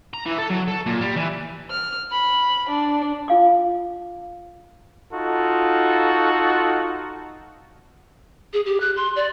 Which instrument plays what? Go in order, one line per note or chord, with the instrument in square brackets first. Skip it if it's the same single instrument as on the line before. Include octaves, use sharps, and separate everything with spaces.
[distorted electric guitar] A#5
E3
A4
F#3
A4
A#2
G3
E3
[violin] F6
B5
D4
[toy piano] F4 F5 D6
[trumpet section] D#4 F4 F#4 A4
[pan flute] G#4
G4
F#6
C6
D5